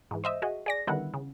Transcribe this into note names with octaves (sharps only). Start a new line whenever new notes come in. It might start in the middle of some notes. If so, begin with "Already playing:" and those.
G#2 E3
C5 D#5 E5
F#4 G#4 D#5
G#4 D5 A#6
D3 D#3 G3 B3 E4 F#5
C#3